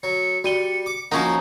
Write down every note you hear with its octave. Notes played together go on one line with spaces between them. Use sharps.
F#3 C#7
G3 F#4 D#7 G7
D6
F3 A#3 C#4 D#4 F4 F#4 F#5 C#6